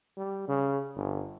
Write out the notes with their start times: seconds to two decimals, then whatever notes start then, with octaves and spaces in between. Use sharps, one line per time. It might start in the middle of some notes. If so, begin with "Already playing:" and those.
0.17 G3
0.48 C#3
0.96 G1